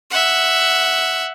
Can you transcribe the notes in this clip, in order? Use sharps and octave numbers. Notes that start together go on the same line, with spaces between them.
E5 F#5